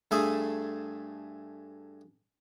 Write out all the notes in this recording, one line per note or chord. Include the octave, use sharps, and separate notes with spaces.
G2 A3 G#4 E5 G#5